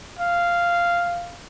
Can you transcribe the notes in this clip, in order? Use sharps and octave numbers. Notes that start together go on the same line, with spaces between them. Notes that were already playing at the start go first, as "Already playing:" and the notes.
F5